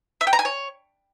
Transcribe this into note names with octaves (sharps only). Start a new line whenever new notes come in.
E5
G5
A#5
G#5
C#5